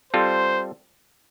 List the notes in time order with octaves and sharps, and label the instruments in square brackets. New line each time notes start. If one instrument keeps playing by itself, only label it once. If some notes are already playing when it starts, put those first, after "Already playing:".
[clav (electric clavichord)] G3 C4 F4 A4 [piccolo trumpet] C5